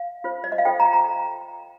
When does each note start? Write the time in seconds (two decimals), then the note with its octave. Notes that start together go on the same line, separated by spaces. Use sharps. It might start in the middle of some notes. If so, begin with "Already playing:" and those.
Already playing: F5
0.24 F4 C5
0.44 D5
0.52 D#5
0.58 F5
0.65 F4 A4 C5 G5
0.80 A#5
0.93 A#5